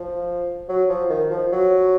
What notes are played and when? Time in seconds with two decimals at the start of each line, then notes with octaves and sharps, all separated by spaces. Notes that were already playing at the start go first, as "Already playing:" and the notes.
Already playing: F3
0.69 F#3
0.89 F3
1.10 D#3
1.31 F3
1.52 F#3